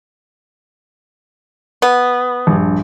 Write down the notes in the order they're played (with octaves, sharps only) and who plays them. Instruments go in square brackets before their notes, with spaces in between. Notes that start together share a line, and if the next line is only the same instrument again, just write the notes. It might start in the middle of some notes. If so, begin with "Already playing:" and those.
[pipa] B3
[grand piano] A#1 G2